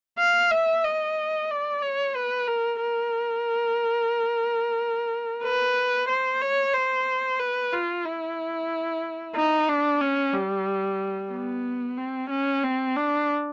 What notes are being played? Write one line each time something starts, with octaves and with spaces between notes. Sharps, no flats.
F5
E5
D#5
D5
C#5
B4
A#4
A#4
B4
C5
C#5
C5
B4
F4
E4
D#4
D4
C#4
G3
B3
C4
C#4
C4
D4